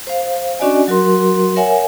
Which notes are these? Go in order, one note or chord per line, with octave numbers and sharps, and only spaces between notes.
C5 F5
C#4 D4 F#4 D5 D#5 G#5
F#3 F#4 A#4 C6
A#4 C#5 E5 F#5 G#5